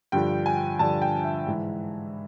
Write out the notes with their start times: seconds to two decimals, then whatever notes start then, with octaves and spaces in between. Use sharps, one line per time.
0.12 G2 D3 F3 G5
0.46 G#5
0.79 G2 D3 F3 A5
1.02 G5
1.24 E5
1.47 G#2 E3